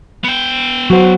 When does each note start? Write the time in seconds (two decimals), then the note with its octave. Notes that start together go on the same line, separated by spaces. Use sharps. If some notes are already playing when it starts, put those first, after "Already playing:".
0.24 B3 G5
0.90 F#3 F#4 C5